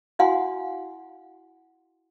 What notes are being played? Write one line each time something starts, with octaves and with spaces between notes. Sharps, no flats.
E4 F#4 F5 F#5 G#5 C6